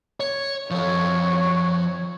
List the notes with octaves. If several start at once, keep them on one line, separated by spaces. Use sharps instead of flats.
C#5
F3 A4 C#5